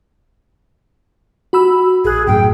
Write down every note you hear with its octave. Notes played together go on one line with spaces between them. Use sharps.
F#4 B5 E6
A#1 G#4 F#6
F#2 A2 G5